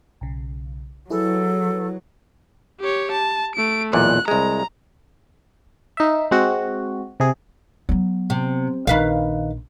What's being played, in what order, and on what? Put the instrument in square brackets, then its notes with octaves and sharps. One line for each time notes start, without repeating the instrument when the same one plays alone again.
[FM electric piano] B1 C#3
[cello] F#3 [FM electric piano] E4 G#4 B4 [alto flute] A4
[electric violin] G4 C#5
A5
A3 D7
[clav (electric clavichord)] B1 E2 A#2 [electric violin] F#6
[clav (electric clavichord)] C2 G#3 [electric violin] A#5
[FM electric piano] D#4 E5
G#3 C4 F#4
C3 G#4
[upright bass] F#3 B3
[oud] C3
[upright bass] A#1 [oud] D#3 B4 F5